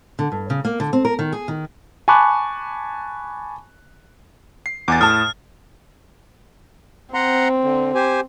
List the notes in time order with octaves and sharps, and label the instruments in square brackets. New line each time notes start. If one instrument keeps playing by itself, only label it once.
[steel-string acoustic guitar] D3
G2
C#3
A#3
D3
C4
A#4
D#3
G#4
D#3
[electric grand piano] G#5 A5 B5 C#6 D6 F#6
C7
[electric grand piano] E2 G#5 [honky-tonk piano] D6 A6
[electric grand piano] A2 [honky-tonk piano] A5 D#6 [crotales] F6
[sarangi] C4 [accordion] F#5 A#5 C6
[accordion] D3
G4 C5 G#5